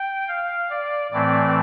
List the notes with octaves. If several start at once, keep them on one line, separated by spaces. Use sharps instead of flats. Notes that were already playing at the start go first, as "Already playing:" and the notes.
Already playing: G5
F5
D5
A2 E3 A3 C4 D5